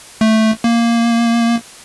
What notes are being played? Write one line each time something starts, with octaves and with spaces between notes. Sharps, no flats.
A3
A#3